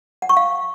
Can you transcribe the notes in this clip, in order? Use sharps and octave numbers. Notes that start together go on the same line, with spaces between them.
F#5
C#6
F5